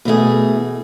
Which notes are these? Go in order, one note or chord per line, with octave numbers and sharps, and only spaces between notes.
B2 E3 A3 G#4